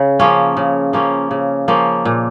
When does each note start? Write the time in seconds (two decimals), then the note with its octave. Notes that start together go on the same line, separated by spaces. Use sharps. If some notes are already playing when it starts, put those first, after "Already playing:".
Already playing: C#3
0.19 F3 A#3 C#4
0.57 C#3
0.93 F3 A#3 C#4
1.31 C#3
1.68 F3 A#3 C#4
2.05 A#2